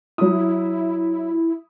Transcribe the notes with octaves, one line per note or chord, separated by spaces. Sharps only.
F#3 E4 D#6